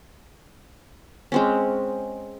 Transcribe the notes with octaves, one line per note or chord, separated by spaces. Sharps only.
G#3 C4 C#4